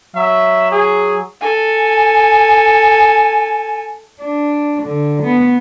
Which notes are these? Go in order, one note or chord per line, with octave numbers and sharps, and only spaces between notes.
F#3 E5
G#4
A4 G#5
D4
D3
B3